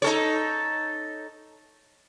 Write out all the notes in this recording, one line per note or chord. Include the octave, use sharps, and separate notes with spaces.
D#4 A4 C#5